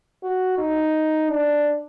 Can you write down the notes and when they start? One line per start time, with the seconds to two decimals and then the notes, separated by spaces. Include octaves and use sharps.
0.23 F#4
0.58 D#4
1.30 D4